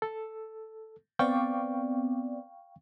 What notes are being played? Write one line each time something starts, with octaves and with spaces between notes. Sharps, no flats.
A4
B3 C4 D5 F5 G5 C#6